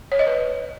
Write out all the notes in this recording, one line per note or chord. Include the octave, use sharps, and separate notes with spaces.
C#5
D#5
B4